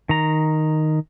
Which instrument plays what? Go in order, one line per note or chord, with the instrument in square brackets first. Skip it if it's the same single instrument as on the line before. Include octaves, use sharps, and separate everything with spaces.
[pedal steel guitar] D#3 A#5